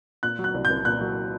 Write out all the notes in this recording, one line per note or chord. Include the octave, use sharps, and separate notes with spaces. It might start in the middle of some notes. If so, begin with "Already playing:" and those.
A#2 F#6
F#3
F#6
C2
G6
C2
A#2 F#6
F#3